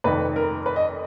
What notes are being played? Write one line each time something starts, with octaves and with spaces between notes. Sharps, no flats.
F1 F2 D#3 B4
A#4
B4
D#5